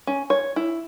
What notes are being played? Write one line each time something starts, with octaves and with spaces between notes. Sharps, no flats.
C#4
C#5
E4